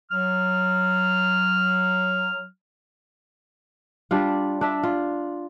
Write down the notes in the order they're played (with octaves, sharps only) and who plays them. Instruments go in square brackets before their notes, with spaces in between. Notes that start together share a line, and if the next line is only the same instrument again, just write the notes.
[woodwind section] F#3 F6
[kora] G3 D4 F4
D4 E5
F4